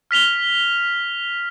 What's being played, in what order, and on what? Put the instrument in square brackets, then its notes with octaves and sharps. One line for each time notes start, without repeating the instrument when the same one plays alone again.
[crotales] F6 B6 F7 G7